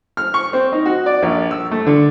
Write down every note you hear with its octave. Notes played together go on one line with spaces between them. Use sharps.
F6
C#6
C4
D#4
F#4
D5
A#1
E6
A3
D3